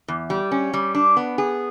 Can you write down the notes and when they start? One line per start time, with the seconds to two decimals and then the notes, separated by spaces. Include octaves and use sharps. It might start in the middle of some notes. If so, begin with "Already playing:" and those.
0.08 E2
0.30 G3
0.51 C#4
0.74 G3
0.95 D4
1.17 B3
1.38 G#4